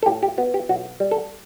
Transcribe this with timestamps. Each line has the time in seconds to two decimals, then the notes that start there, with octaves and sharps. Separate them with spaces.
0.03 A4
0.06 A2 G4
0.23 G4
0.38 B3 F#4
0.54 G4
0.69 B1 F#4
1.00 G3
1.11 A4